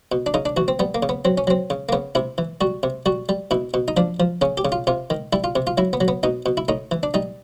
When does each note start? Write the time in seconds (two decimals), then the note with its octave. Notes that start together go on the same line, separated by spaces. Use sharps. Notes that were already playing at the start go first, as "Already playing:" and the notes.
0.12 B2
0.26 D4
0.34 C#3 D#4
0.46 D4
0.57 E3 F#4
0.68 C4
0.79 G3 B3
0.95 A#3
1.03 C#3
1.09 B3
1.25 F#3 C4
1.38 C#4
1.47 F#3 C4
1.70 C#3
1.89 A#3
1.92 C#3 B3
2.15 C3 E4
2.38 E3
2.61 G3 F#4
2.83 C3
3.06 G3 F#4
3.29 G3
3.51 B2 E4
3.74 B2
3.88 D#4
3.97 F3 D4
4.20 F3
4.41 C#3 C#4
4.57 G4
4.65 C#3
4.72 F4
4.87 C3 F4
5.10 D#3
5.33 G3 E4
5.44 F4
5.56 C3
5.67 F4
5.78 F#3 E4
5.93 B3
6.01 F#3
6.08 B3
6.23 B2 D#4
6.46 B2
6.57 E4
6.68 A2 D#4
6.91 E3
7.03 D4
7.14 G3 D#4